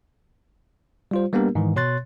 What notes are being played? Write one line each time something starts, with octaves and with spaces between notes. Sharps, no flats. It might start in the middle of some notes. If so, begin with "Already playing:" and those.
G3 F4 C5
G3 A#3 B3 D4 G4 A#4
G#2 D#3 E3
B2 C#5 C6 F#6 A6